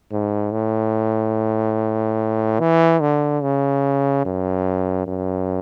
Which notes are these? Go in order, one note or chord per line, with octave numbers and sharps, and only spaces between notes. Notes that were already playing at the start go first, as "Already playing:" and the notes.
G#2
A2
E3
D3
C#3
F#2
F#2